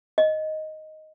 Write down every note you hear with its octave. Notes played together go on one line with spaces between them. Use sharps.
D#5